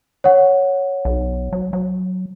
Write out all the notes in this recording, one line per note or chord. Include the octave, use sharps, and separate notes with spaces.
C#5 F#5
B1
F#3
F#3